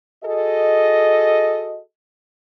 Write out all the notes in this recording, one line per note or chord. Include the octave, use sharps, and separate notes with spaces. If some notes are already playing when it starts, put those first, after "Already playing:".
F#4 G#4 A4 D#5